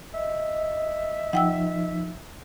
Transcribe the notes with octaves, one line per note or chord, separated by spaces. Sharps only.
D#5 E5
F3 D#4 F#5 G5 E6